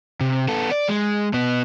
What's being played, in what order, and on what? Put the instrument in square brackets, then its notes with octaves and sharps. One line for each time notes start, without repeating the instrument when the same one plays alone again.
[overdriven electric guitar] C3
B3 A4
D5
G#3
B2 B3